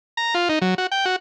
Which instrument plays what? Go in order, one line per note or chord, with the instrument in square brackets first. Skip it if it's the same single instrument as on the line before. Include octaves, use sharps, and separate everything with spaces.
[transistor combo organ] A#5
F4
D#4
F#3
F#4
G5
F#4